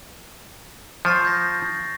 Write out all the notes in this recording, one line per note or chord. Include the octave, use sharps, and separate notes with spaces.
F3 C#6 A6 C7
G6 A#6